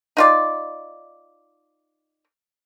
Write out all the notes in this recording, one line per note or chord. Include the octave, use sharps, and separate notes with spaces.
D#4 F4 D5